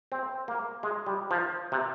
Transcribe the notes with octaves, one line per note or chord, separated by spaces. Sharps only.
C4
A#3
G#3
G3
F3
C3